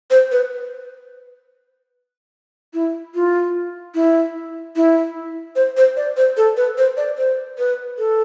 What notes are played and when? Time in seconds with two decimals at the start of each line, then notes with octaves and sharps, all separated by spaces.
0.11 C5
0.32 B4
2.74 E4
3.15 F4
3.95 E4
4.76 E4
5.56 C5
5.77 C5
5.96 D5
6.17 C5
6.37 A4
6.57 B4
6.78 C5
6.97 D5
7.18 C5
7.58 B4
7.98 A4